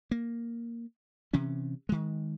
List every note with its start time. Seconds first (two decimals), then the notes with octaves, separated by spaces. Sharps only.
0.11 A#3
1.33 C3 E3 C#4
1.89 D#3 G#3